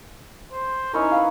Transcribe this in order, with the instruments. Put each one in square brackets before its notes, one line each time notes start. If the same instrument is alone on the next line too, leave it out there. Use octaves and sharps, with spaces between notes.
[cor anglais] C5
[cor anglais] C#4 [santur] D#4 E4 A#4
[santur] B4 F5